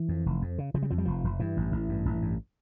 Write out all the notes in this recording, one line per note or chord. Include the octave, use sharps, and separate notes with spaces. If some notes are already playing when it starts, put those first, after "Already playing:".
Already playing: E3
F2
F1
F2
C#3
C#3 F3
G3
F2 F3
G3
F1 F3
F1
G2 E3
A1
A1
G2
A1
G2